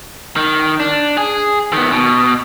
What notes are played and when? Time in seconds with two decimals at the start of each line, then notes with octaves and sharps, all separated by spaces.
0.37 D#3
0.80 D4
1.18 G#4
1.73 D#3 B3
1.92 B2